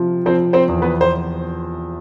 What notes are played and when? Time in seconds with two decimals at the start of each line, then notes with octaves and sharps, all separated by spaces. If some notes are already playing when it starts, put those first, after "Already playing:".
Already playing: C3 F3
0.26 F3 C4 C5
0.53 C4 C5
0.68 E2
0.82 B3 B4
1.01 C5